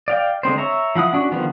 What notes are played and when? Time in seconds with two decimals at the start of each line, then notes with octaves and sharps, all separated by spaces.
0.08 D5 F5 G5
0.43 D3 G#3 C4 C5
0.58 C#5 E5 A#5
0.95 F3 E4 F#5 D#6
1.13 C#4 D4 F#4
1.31 D3 D#3 F3 G3 B3